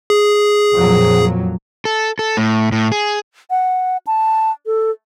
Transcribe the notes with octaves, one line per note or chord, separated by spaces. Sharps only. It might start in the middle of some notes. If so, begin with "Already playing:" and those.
G#4
F2 A#2 F#3
A4
A4
A2
A2
G#4
F#5
A5
A4